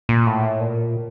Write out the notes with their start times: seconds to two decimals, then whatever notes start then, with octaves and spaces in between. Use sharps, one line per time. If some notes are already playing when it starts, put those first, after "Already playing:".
0.09 A#2
0.27 A2
0.60 A#2